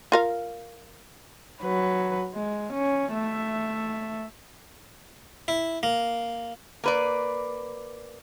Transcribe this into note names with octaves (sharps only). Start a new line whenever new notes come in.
F4 A#4 F5
F#3 B4
G#3
C#4
A3 E5
E4
A#3
A#3 B4 D5